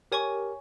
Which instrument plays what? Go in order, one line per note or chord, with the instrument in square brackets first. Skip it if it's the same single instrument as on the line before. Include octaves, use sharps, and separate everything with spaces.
[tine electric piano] G4 A#4 [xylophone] C#5 G#5 C#6